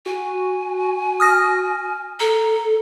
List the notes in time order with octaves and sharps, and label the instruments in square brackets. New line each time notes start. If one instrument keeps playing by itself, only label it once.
[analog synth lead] F#4 [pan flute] G#5
[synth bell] D#6 F6 A#6
[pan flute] A4 [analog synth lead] A#5